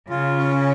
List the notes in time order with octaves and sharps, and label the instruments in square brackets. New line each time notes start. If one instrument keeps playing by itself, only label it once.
[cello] C#3 [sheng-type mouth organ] F4
[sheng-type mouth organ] C#4